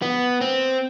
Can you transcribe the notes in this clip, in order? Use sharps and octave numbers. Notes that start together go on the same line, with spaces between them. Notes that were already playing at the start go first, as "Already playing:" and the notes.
B3
C4